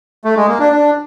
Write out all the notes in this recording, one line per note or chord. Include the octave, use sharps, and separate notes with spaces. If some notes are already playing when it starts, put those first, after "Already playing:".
A3
G#3
A#3
D4
D4